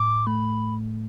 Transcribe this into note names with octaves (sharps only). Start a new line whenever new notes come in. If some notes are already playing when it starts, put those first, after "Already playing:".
Already playing: A2 D6
A3 B5